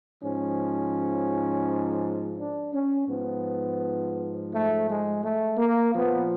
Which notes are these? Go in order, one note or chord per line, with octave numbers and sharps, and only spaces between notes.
G#2 F3 C#4
D4
C#4
G#2 F3 B3
A3
G#3
A3
A#3
A#2 F3 B3